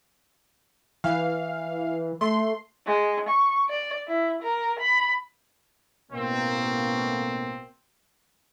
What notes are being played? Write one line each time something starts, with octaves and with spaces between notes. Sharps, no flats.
E3 F5
A3 C6
G#3
C#6
D5
E4
A#4
B5
A1 B2 A#3 C4